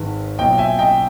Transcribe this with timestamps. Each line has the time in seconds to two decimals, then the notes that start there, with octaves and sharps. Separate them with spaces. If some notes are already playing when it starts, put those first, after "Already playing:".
Already playing: G#1 G#2 D#3 B4
0.38 B1 A#2 D#5 G5
0.58 E5 G#5
0.79 D#5 G5